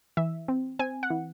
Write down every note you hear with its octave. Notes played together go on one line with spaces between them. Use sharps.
E3 E5
C4
C4 G#5
F#5
E3